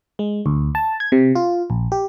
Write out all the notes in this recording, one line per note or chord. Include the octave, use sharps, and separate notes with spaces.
G#3
D2
A5
G#6
C3
F4
A#1
G4